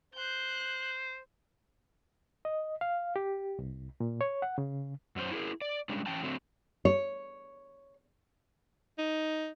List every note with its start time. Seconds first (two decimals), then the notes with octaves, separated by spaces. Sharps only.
0.14 C5 F#6 G6
2.45 D#5
2.81 F5
3.16 G4
3.59 C2
4.00 A#2
4.21 C#5
4.42 F#5
4.58 C#3
5.16 F#2 C#4 C5
5.31 E4 G#4 A#4
5.62 D5
5.89 G3 G#3 C#4 D4
6.06 E3 C#4 G5 A5
6.23 D3 F#3 A3 C4
6.85 C#5
8.98 D#4